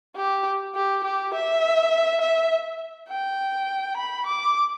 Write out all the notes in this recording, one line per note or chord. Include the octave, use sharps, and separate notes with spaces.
G4
G4
G4
E5
E5
G5
B5
D6